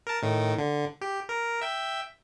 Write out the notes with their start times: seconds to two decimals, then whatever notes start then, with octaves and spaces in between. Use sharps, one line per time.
0.07 A#4 A5
0.22 A2 D#3
0.58 D3
1.01 G4
1.29 A#4
1.61 E5 G5